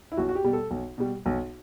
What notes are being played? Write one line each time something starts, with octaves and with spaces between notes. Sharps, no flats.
E4
B1 F#4
F#4
G4
B2 G3
A4
B1
B2 G3
B1